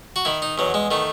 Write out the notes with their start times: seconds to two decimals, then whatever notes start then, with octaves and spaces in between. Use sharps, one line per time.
0.16 F#4
0.25 D#3 E4
0.42 D#4
0.58 E2 F#3
0.74 G#3
0.91 D#3 A3